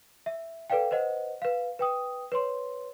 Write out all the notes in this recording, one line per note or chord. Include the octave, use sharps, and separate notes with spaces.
E5
A4 B4 D5 F5 G5
B4 C5 D#5 F#5
B4 F5
B4 G5 D#6
B4 C#5 C6